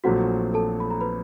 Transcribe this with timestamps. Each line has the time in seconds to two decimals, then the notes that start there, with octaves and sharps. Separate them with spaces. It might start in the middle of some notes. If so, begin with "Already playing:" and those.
0.04 A#1 A#2 F#3 A3 C4 F#4 F#5
0.54 A4 A5
0.80 B5
0.90 A#5
1.01 B4 B5